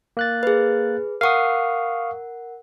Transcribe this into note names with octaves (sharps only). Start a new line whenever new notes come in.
A#3 F#6 A6
G#4 B4
A#4 F5 F#5 C#6 D#6